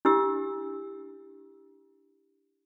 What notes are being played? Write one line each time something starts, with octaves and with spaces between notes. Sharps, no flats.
D4 E4 G4 E6